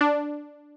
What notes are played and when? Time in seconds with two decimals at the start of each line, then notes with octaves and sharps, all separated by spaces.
0.01 D4